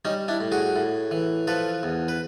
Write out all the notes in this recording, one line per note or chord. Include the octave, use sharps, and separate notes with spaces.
G3 C#4 D#4
D4 E4
A2
F#4 G#4
A2
E3
F3 A4 B4
E2
B4